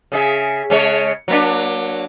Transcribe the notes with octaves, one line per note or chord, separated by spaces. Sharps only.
C#3 G#4 E5
C#3 G#3 C#5
F#3 A#3 D4